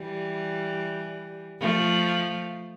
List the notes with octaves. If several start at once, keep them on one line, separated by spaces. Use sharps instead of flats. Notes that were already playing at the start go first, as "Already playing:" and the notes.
Already playing: E3 G3
F3 A3